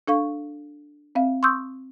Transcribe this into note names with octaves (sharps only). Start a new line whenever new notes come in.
D4 A4 F5 C#6
C4 E5 F5
C6 C#6 D#6 E6 G6